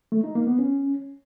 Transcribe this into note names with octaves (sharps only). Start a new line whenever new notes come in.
A3
D#4
A#3
B3
C#4